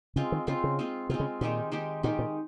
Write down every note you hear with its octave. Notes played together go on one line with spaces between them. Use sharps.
C#3 G#3 C4 F4
D#3
C#3 G#3 C4 F4
C#3
G#3 C4 F4
C3 G#3 C4 F4
C#3
A#2 D#3 G#3 D#4 G4
D#3 G#3 D#4 G4
A#2 D#3 G#3 D#4 G4
A#2